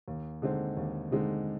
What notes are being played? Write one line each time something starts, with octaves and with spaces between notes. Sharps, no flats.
D#2
D3 G#3 C4 D#4
D#2
D3 G#3 C4 D#4